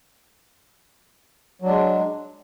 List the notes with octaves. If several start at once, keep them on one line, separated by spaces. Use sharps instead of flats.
F#3 G#3 D4